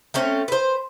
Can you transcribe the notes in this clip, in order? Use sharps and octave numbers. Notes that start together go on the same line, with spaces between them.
A3 C4 C#4
B4 C5